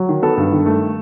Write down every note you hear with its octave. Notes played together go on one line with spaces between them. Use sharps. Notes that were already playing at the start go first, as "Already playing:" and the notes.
Already playing: F#3
D#3
B3 A4
G2
D#3
A3